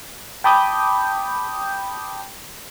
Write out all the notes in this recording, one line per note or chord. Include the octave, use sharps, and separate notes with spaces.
G5 A5 B5 D6 D#6 G6